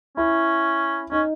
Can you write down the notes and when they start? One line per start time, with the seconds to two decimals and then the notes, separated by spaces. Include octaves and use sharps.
0.17 C#4 E4
1.11 C#4 D#4